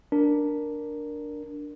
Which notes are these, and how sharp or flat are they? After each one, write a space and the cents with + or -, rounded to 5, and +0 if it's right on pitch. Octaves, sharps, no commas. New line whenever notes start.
D4 +0 A#4 +0